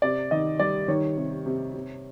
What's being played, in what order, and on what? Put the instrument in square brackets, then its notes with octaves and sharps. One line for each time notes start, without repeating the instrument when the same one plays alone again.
[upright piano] C3 D5
D#3 D#5
G3 D5
D#3 C#5
C3
C3
C3